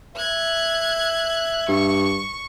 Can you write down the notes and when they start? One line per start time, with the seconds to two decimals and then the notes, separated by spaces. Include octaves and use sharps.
0.16 E5 F#6 G#6
1.68 G2 C#6